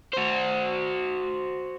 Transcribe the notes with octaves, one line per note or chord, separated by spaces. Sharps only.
F#4 C5